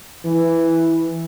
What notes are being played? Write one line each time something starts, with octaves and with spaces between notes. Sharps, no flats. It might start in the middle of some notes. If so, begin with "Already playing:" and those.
E3